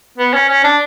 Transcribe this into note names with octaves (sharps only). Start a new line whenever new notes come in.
B3
C#4
C#4
D4